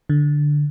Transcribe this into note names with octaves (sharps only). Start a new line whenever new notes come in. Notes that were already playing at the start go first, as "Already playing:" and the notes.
D3